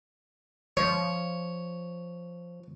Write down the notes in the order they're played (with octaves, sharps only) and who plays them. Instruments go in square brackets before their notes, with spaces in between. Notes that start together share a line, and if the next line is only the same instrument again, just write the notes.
[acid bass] F3 [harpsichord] C#5